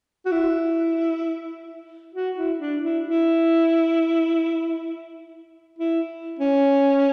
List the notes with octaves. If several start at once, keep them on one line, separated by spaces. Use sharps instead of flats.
F#4
E4
F#4
E4
D4
E4
E4
E4
C#4